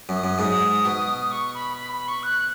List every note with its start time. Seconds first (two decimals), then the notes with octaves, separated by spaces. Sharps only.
0.09 F#2
0.16 D#6
0.24 F#2
0.39 G#2 D#6
0.85 B2
1.31 C#6
1.54 B5
1.77 B5
1.93 B5
2.08 C#6
2.23 F#6